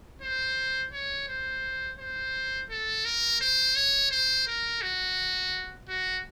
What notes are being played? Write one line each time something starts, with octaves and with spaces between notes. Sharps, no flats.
C5
C#5
C5
C5
A4
A#4
C5
C#5
C5
A#4
F#4
F#4